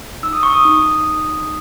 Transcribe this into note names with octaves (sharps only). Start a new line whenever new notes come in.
D#4 E6
D#6
C#6
D#6
D#4